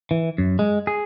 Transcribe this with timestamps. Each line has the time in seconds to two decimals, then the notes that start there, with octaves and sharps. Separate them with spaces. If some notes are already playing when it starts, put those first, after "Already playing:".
0.11 E3
0.38 F#2
0.59 G#3
0.87 G#4